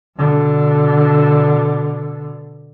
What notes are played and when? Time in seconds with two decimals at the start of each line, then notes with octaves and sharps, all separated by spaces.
0.17 B2 D3